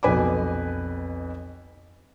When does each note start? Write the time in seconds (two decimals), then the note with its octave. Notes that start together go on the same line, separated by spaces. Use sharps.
0.03 B1 F2 B4 G#5 B5 D6